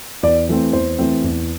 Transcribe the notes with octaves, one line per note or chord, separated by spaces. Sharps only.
E2 D5
E3 A3 C4
E2 C5
E3 A3 C4
E2